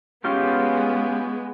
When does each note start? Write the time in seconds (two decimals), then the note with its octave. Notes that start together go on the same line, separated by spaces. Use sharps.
0.24 G#3 B3 C#4 F4 G4